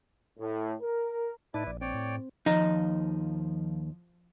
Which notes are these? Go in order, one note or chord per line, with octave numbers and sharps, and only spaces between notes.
A2
A#4
A2 D#4 E4 B4 D5 A5
A#1 D5
C4 C#5 D5 G5
A2
D#2 F3 D#4